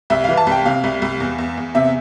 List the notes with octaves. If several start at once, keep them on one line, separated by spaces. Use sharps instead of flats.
C2 E5
E3 F5
A5
C2
G5
C3 F5
C2
C2
E2
E2
E2
C3 E5